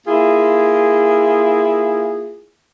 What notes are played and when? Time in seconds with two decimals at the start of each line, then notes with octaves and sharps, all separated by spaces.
0.07 A#3 E4 F4 G#4